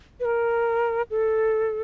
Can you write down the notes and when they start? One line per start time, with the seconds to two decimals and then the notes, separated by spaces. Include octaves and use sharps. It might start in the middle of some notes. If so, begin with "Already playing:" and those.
0.20 B4
0.25 A#4
1.10 A4